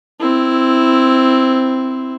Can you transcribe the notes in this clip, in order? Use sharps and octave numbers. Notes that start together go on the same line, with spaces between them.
C4 E4